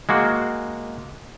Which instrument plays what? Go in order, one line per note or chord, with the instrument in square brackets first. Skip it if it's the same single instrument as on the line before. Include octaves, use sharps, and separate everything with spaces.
[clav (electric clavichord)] G#3 A#3 F#4